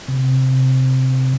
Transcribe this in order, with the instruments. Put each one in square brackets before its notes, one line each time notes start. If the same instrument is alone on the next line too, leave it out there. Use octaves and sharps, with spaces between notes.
[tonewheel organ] C3